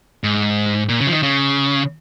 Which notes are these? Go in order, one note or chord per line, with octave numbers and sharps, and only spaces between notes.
G#2
A#2
C#3
F3
D#3
C#3